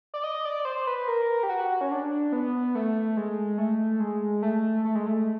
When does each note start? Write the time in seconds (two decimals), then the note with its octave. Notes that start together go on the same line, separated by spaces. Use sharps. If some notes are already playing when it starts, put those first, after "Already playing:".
0.14 D5
0.24 D#5
0.45 D5
0.65 C5
0.87 B4
1.08 A#4
1.43 G4
1.49 F#4
1.81 C#4
1.91 D4
2.32 B3
2.75 A3
3.17 G#3
3.58 A3
4.00 G#3
4.42 A3
4.85 A3
4.95 G#3
5.07 A3